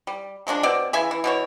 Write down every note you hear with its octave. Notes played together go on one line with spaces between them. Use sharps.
G3
F3 G#3 C#4 D4
B2 C4 D5
C#3 E3 E5 G#5
E3
B2 E3 C#5